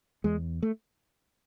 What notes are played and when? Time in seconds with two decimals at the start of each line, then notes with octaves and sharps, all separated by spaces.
0.24 E2 G#3
0.63 A3